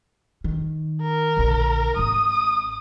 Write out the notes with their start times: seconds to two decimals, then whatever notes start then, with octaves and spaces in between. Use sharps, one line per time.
0.44 D#3
1.01 A#4
1.37 A#1 D3
1.97 G#1 C4 D#6